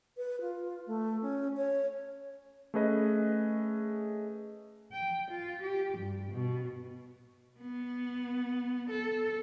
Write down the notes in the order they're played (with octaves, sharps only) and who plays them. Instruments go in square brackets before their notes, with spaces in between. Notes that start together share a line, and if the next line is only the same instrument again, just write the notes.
[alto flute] B4
F4
A3
C#4
C#5
[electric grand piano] A3 C#4 G#4 B4 D#5
[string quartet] G5
F4
G4
G2
B2
[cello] B3
A4